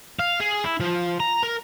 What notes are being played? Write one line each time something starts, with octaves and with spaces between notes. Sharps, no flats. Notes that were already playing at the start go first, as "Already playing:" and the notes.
F5
G#4
E4
F3
A#5
A#4